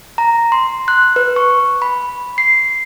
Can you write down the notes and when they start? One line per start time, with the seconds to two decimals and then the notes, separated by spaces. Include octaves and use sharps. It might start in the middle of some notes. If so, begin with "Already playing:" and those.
0.18 A#5
0.52 C6
0.88 F#6
1.16 B4
1.36 C#6
1.82 B5
2.38 C7